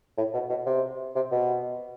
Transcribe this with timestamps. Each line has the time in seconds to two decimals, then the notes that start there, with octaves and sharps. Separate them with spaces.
0.18 A2
0.34 B2
0.50 B2
0.66 C3
1.15 C3
1.32 B2